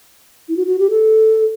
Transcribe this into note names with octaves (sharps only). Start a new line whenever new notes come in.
E4
F#4
F#4
G4
A4